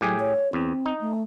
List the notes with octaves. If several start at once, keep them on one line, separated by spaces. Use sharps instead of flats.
A2 F#3 G4 G#4
C#5
E2 C4
D#4
A3